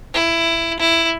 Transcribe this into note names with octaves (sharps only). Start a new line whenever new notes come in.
E4
E4